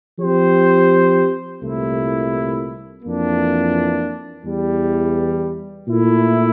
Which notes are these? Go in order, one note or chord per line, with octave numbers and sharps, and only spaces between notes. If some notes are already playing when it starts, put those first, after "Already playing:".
F3 C4 G4 C5
C2 A#2 A3 E4
F2 E3 A#3 D4
E2 E3 G3
A#2 A3 E4